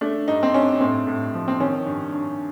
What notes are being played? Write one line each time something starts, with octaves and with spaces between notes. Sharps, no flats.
A3 D4
G2 D#4
C4
G2 C#4
A2 C4
A2
F3
C4
D#3 C#4
G2
G2